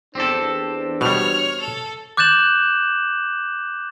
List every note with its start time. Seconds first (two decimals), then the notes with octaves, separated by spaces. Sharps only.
0.15 E2 C4 D4 G4 A4 C5
1.01 B2 G3 C#5 F6
1.61 A4
2.17 D6 F#6 G6 A6 E7 F#7